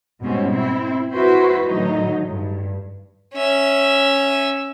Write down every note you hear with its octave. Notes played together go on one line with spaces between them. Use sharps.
G#2 B2 G3 C4 C#4
C4 E4
E4 F#4 B4 C5
A2 D3 D#3 F#3 D#4
G2
C#4 E5